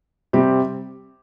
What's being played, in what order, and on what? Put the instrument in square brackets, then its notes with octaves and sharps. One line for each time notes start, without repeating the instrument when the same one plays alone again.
[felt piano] C3 G3 C4 G4